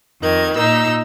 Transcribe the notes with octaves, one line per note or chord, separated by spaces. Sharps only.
F2 D#3 G#6
A#2 D#4 A#5 E6